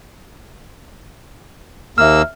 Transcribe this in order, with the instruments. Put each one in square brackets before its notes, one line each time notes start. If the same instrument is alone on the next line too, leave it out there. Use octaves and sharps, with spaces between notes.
[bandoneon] D#2 A#3 E6 [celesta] E5 F6